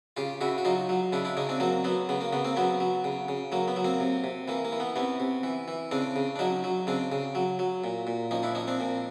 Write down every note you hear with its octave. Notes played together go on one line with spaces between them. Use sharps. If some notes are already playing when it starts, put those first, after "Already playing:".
C#3 F4 G4
C#3 E4 F#4
F#4
F#3 D#4 F4
F#3
C#3 D4 E4
D4 E4
C#3 C#4 D#4
C4 D4
F#3 A#3 C4
F#3 B3
C#3 B3
A#3
C#3 B3
A#3 C4
F#3 B3 C#4
F#3
C#3
C#3
F#3 A#3
B3
F#3
A#3 C4
C3
C3
E3 A#3
A#3
E3
B3
C3 B3 C#4
C3
E3
E3
C#3 C4 D4
C#3
D4
F#3 C#4 D#4
F#3
C#3 C4 D4
C#3
F#3
F#3
A#2
A#2
F3 C#4 D#4
D4 E4
F3 C#4 D#4
C4 D4
A#2